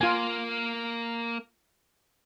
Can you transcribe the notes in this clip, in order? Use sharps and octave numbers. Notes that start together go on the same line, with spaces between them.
A#3 F4 G#5